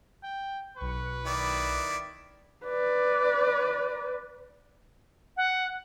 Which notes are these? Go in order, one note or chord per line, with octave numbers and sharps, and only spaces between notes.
G5
B1 B4 C#6
D#3 E4 D5
B4 D5
F#5